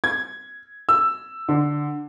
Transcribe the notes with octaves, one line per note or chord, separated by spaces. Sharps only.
G#6
E6
D3